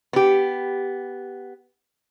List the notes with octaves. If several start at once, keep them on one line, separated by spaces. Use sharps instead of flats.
B3 G4